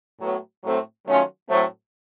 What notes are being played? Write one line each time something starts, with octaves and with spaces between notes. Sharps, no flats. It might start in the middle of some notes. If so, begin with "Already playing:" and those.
A2 F#3 B3
A2 F#3 A3 C4
D#3 F#3 A3 C#4 F4
A2 F#3 A3 C4